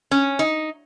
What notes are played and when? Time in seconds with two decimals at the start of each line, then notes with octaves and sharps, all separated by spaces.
0.11 C#4
0.39 D#4